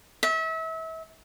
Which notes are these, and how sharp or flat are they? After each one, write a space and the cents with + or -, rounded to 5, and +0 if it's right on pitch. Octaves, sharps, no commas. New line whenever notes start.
E5 -35